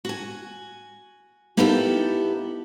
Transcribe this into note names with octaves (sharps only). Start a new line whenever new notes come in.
F#4 G#5
A#3 B3 D#4 E4 G4 A4